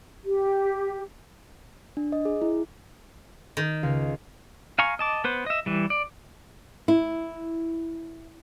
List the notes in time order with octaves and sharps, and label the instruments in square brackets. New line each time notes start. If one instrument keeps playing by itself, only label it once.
[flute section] G4
[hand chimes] D4
D#5
G#4
E4
[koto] D#3
[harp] C#2 F5 C7
[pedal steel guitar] F5 G#5 A#5 C#6
D#5 A5 D6
B3 B4 C5
D#5 E5
E3 G3
D5
[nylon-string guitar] E4